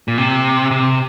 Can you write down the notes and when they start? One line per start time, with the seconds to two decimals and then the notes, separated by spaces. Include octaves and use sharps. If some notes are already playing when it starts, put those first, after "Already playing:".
0.08 A#2
0.18 C3
0.71 C3